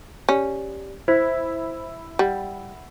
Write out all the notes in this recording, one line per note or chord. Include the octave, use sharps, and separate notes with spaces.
C#4 G4 D5
E4 C5 G#6 B6
G3 F#5